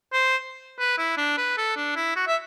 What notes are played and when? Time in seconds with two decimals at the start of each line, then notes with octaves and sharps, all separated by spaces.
0.13 C5
0.79 B4
0.98 E4
1.17 D4
1.37 B4
1.58 A4
1.77 D4
1.96 E4
2.16 F#4
2.27 E5